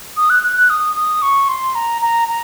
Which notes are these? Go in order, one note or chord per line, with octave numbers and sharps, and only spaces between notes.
D#6
F#6
F#6
F#6
D#6
D#6
C#6
C6
A#5
A#5
A#5